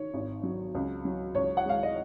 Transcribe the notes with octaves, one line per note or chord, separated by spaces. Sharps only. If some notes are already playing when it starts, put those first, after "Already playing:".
Already playing: D#3 C#5
G#1
F#3
C#2
F#3
C#2 C#5
F#5
G#3 F5
D#5